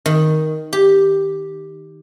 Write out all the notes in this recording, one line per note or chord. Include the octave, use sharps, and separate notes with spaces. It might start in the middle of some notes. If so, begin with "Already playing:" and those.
D#3
G4